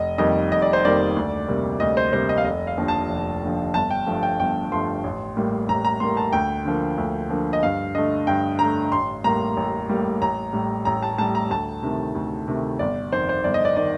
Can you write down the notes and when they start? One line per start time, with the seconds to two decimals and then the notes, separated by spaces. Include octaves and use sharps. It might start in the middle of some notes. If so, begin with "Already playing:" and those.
Already playing: F1 D#5
0.18 F2 D#3 G3 A#3 D#5
0.51 F1 D#5
0.62 D5
0.73 C5
0.84 F2 D#3 G3 A#3 D5
1.16 D2
1.48 C3 G3 A#3
1.80 D2 D#5
1.97 C5
2.13 C3 G3 A#3 C5
2.29 D#5
2.38 F5
2.45 F1 D#5
2.67 F5
2.78 D#2 D3 F3
2.88 A5
3.10 F1
3.43 D#2 D3 F3
3.74 G1 A5
3.90 G5
4.06 G2 F3 A3
4.23 G5
4.39 G1 G5
4.72 G2 F3 A3 C6
5.04 A1
5.37 A2 G3 A#3
5.69 A1 A#5
5.85 A#5
6.00 A2 G3 A#3 C6
6.17 A5
6.33 D2 G5
6.65 D3 F3 A#3
6.98 D2
7.30 D3 F3 A#3
7.53 D#5
7.63 G2 F5
7.95 D3 A3 D#5
8.27 G2 G5
8.59 D3 A3 A#5
8.92 A1 C6
9.24 A2 G3 A#3 A#5
9.57 A1
9.89 A2 G3 A#3
10.22 A1 A#5
10.53 A2 G3
10.85 A1 A#5
11.03 A5
11.18 A2 G3 A5
11.35 A#5
11.50 D2 A5
11.83 C3 D#3 A3
12.15 D2
12.48 C3 D#3 A3
12.79 G1 D5
13.12 F2 D#3 C5
13.29 C5
13.44 G1 D5
13.54 D#5
13.65 D5
13.77 D#3 D5